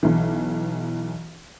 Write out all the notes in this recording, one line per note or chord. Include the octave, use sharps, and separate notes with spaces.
B1 E3